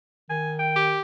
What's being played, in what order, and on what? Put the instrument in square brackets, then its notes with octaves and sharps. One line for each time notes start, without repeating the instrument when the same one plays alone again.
[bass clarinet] D#3 [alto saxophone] G#5
[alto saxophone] G5
[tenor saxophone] G4